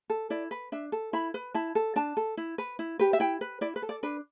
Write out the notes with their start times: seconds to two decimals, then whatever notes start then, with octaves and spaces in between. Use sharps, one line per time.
0.10 A4
0.30 E4 D5
0.51 B4
0.72 D4 E5
0.92 A4
1.13 E4 B5
1.34 B4
1.54 E4 A5
1.75 A4
1.96 D4 A5
2.17 A4
2.37 E4
2.58 B4
2.79 E4
2.99 G4 B4
3.13 E5
3.20 E4 G5
3.41 B4
3.61 E4 D5
3.76 B4
3.82 A4
3.89 D5
4.03 D4 B4